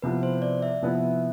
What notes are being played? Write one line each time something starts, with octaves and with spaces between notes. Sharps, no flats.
C3 F3 B3 E4 B4
C5
D5
E5
C3 F3 B3 E4